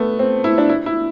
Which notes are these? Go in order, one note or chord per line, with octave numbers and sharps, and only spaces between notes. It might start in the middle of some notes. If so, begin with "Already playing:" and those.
Already playing: A3 B3
C4
E4
D4
E4
E4